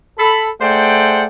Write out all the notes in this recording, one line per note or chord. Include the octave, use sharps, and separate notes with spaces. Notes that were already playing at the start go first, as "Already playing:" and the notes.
A4 B5
A3 G#4 C5 D5 F#5 G5